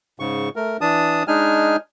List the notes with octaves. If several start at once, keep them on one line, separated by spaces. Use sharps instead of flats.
G#2 C#3 C#6
A3 A#4
E3 D4 A5 D#6
G#3 D4 D#4 G#5 F6